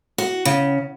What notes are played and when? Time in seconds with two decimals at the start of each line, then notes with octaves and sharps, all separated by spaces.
0.18 F#4
0.45 C#3